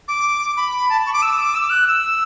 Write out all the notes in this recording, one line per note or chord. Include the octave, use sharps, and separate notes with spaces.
D6
B5
A5
C#6
D6
E6
D6
E6
F#6
E6